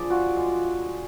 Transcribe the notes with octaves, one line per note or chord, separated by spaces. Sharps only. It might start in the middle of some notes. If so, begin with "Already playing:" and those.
Already playing: F3 D4 G#4 D5
F4 F#4
G#3